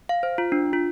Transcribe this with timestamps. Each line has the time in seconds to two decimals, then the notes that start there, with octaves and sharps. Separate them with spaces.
0.09 F5
0.23 C5
0.38 F4
0.52 D4
0.73 F4